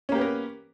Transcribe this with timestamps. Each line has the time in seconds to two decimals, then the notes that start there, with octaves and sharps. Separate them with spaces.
0.09 C#4
0.12 A#3
0.15 G4
0.18 B3
0.21 A#4